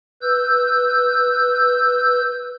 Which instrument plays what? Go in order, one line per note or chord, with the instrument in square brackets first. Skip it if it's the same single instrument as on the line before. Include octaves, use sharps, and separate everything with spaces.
[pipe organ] B4 E6 G6